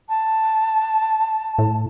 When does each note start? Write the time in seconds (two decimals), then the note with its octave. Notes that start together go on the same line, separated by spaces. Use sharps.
0.09 A5
1.58 A2